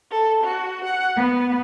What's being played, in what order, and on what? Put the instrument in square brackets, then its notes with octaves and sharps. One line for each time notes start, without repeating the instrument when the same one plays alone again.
[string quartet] A4
F#4
F#5
B3